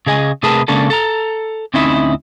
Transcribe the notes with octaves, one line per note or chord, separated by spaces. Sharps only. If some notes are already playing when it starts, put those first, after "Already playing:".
C#3 G#4 D#5 G#5
C3 A3 G#4 A#4 B4 A5
C#3 G#3 A#3 C#4 D4 A4
A4 A#5
D2 C4 C#4 D#4 E4 E5